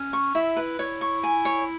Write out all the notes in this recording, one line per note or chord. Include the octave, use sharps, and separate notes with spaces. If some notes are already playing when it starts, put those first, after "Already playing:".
Already playing: C#4
C#6
E4 E5
B4
E4 C#5
C#6
G#5
C#5